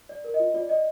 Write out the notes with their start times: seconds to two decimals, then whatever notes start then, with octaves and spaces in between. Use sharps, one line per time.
0.09 D5
0.24 A#4
0.34 D#5
0.40 F4
0.54 F4 D5
0.69 D5 D#5